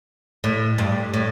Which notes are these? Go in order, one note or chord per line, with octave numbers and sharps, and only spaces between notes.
A2
G2
A2